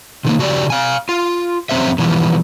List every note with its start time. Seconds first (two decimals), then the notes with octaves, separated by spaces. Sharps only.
0.25 C3 D#3 A#3
0.39 C#3 F#4 G4 D5
0.70 F5 G#5
1.09 F4
1.69 F2 F#3 C4 C#4 C5 E5
1.98 B2 E3 F3 G3